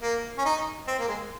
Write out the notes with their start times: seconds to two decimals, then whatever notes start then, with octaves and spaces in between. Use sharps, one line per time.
0.02 A#3
0.38 C#4
0.45 D#4
0.88 C4
0.99 A#3
1.08 G#3